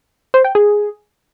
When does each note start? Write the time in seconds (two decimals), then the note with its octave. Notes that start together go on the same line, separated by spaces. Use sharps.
0.34 C5
0.44 G5
0.55 G#4